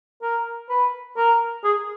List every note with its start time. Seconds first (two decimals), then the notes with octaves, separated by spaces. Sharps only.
0.22 A#4
0.69 B4
1.17 A#4
1.64 G#4